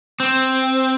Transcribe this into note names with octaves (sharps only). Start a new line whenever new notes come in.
C4